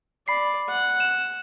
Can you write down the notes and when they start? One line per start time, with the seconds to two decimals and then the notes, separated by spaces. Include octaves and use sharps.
0.28 D5 B5 C7
0.69 F#5
1.00 E7